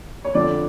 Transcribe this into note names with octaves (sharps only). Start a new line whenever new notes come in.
C#5
F2 D3 F3 D4 D5